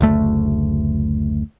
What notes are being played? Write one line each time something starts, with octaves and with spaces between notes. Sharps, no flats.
F#1 D2 A3